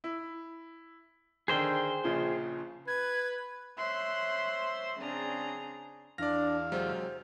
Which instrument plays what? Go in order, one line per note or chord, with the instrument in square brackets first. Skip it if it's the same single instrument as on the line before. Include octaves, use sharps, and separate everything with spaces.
[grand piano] E4
[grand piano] D3 D#3 G6 [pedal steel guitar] G#4 C5 G5
[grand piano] A#1 C#3 F3
[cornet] B4 [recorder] G#6
[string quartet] C5 C#5 E5 C6 E6 F#6
C#3 C4 D4 G#4 A#5
[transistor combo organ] E2 F5 [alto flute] D4 [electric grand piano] D5 A#6
[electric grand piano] C3 F#3 G#3 [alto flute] C5